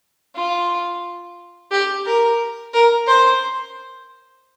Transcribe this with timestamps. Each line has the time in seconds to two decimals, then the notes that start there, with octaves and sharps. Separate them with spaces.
0.35 F4
1.71 G4
2.05 A#4
2.74 A#4
3.07 C5